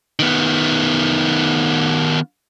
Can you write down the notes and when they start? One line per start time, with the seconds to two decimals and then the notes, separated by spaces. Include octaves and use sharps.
0.19 D#3 B3